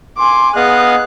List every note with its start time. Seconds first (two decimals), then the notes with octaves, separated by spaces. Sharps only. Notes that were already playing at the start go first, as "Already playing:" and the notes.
0.18 G#5 C6 D6
0.56 B3 G#4 D#5 F5 F#6